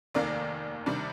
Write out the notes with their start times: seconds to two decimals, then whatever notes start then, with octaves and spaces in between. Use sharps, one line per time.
0.15 F1 D#2 D#3 A#3 A#4 D5
0.86 C3 D#3 G3 D4